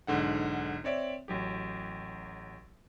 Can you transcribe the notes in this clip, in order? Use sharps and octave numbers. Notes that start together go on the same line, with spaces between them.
B1 G#2 D3 F#5
C4 C#5 D5 E5
A1 F#3 G4